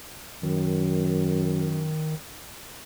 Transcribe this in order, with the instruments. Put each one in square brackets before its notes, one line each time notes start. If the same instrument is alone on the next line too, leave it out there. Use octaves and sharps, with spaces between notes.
[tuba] F#2 [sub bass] D#3